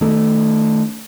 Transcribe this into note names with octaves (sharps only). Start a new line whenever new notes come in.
D#3 A3